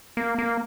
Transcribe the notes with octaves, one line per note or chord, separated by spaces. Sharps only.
A#3
A#3